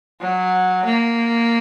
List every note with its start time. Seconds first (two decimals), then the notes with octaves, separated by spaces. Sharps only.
0.21 F#3
0.85 A#3